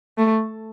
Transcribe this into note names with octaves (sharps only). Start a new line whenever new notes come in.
A3